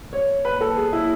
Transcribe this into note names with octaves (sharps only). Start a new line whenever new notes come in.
C#5
B4
A4
G#4
E4